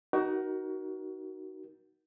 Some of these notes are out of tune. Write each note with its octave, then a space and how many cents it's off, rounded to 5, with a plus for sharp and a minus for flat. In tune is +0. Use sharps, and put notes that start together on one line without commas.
D#4 +0 F#4 +20 A#4 +25